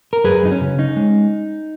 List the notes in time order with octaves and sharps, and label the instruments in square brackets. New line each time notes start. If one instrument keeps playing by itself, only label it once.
[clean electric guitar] A#4
F#2 G#4 B4
F#3 D#4
C#4
C#3
C#4 D#4
G#3